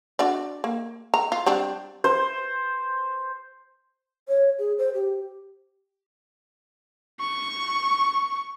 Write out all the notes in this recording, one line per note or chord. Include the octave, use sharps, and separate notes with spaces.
D4 F#4 D5
A#3
A#5
F4
G3 C4 D4
C5
C#5
G#4
C5
G4
C#6